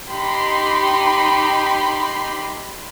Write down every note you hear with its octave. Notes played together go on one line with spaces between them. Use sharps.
D#4 G4 B5 C6